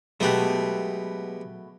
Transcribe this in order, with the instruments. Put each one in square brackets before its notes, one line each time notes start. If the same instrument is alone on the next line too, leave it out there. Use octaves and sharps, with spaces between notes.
[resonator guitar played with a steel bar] B2 A3 [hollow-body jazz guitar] F#3 A5 [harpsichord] G#3 B3 G4